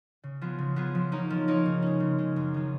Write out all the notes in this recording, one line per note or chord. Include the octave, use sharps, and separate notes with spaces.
C#3
F3 B3 F4 G#4
C#3
F3 B3 F4 G#4
F3
A#3 D#4 A#4 C#5
F3
A#3 D#4 A#4 C#5
C#3
G#3 C#4
C#3
G#3 C#4
F#2
D#3 G#3 D#4